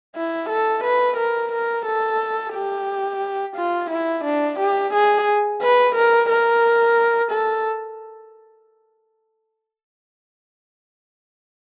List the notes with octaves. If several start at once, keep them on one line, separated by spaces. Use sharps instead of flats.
E4
A4
B4
A#4
A#4
A4
G4
F4
E4
D4
G4
G#4
B4
A#4
A#4
A4